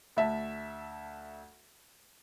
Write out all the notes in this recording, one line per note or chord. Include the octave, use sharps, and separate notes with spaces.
D2 E5 A5